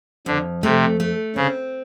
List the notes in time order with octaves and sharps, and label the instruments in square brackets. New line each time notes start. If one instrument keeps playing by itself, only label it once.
[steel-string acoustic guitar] F2 [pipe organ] D3
[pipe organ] C3 [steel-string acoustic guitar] A3
[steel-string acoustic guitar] A3
[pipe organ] C#3 [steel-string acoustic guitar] C4